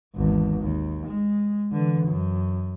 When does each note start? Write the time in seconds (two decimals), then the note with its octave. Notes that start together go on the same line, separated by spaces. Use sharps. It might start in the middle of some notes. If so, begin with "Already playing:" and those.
0.15 G#1 E2
0.61 D#2
1.06 G#3
1.72 D3 E3
2.07 F#2